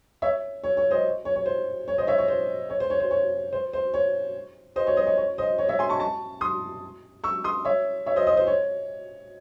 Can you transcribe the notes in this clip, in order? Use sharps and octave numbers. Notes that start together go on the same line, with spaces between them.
C#5 E5
C#5
C#5
C5 D#5
C#5
C#5
C5
C#5
C5 D#5
C#5 E5
C#5
C5
C#5
C5
C#5
C5
C#5
C5
C5
C#5
C5 D#5
C#5
C5 D#5
C#5
C#5
C5 D#5
C#5
C#5 E5
G#5 C6
A5 C#6
A5 C#6
C6 D#6
C#6 E6
C6 D#6
C#5 E5
C#5 E5
C5 D#5
C5 D#5
C5
C#5